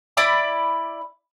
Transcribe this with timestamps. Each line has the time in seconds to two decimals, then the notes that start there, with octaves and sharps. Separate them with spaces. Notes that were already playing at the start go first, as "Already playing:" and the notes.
0.17 E4 D5 B5 D6